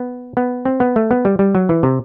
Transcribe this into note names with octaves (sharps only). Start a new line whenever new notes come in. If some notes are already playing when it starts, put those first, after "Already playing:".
Already playing: B3
B3
C4
B3
A3
B3
G3
G3
F#3
E3
C3